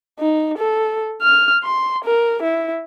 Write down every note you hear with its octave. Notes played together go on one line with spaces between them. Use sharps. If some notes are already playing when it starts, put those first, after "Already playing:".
D#4
A4
F6
C6
A#4
E4